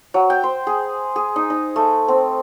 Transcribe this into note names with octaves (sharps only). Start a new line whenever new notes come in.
F#3
G5
C5
G#4
G#4
D#4
D#4
A3
C4